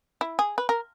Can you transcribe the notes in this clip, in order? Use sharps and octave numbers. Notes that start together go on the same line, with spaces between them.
E4
G#4
B4
A#4